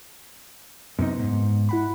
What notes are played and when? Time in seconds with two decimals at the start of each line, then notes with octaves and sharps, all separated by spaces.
0.99 F#2 C3 B3 D#4
1.19 G#2
1.69 E4 F#5 B5